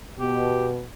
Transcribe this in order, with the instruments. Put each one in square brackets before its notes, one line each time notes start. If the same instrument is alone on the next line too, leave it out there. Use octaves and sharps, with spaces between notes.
[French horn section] B2 [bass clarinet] G4